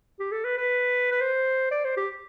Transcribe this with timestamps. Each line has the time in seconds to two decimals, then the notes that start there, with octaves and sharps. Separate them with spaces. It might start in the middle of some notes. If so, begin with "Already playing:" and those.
0.19 G4
0.32 A4
0.45 B4
0.57 B4
1.11 B4
1.21 C5
1.71 D5
1.84 C5
1.97 G4